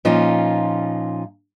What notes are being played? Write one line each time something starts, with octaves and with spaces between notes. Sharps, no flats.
A#2 F3 C#4 D#4 F4